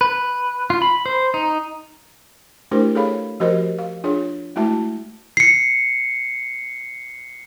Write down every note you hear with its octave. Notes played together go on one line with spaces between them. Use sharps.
B4
F4
B5
C5
D#4
A3 D4 E4 G4 A#4 C5
G#4 A4 C#5 F5 B5
F3 F#4 G4 A#4 C5 D#5
F5
D4 F4 G#4 C#5
G#3 A3 E4 F#4 E5 A5
C7 C#7